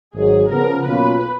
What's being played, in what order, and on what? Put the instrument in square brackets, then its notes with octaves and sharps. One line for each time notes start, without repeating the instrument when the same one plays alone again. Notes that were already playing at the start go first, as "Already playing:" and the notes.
[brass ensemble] G#1 G#2 F#3 [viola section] G#4
[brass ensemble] C#3 F3 B3 [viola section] A#4
[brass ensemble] B1 B2 A#3 C#4 F4 [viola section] B4